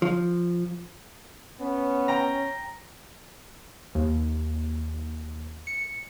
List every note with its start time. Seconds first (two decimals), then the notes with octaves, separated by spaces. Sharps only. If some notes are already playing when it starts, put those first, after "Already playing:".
0.02 F3
1.60 B3 C#4
2.08 G5 A#5
3.95 D#2
5.67 C#7